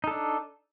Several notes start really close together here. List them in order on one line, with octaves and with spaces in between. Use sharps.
D#4 A4 D4